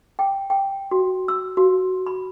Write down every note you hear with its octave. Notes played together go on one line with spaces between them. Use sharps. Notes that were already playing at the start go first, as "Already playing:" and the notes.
G5
G5
F#4
E6
F#4
B5